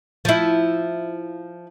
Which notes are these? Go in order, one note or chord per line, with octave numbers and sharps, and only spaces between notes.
F3 E4